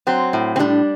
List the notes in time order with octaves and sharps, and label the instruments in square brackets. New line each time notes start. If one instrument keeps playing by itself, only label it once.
[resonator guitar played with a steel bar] F#3 C4
A2
C4
G3 D4